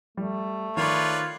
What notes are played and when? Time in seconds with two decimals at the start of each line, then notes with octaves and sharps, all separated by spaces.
0.17 G3 A3
0.77 D#3 F4 B4 C#5 D5